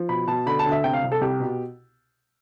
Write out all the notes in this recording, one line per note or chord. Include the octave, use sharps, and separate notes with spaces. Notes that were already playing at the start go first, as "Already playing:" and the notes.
Already playing: F3
B2 B5
B2 A5
D3 B5
A5
D2
E5
C3 G5
F5
C2
A4
C2 G4
B2